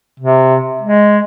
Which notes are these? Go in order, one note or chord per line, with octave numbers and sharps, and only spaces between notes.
C3
G#3